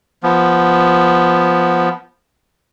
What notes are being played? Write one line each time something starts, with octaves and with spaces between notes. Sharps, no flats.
F3 B3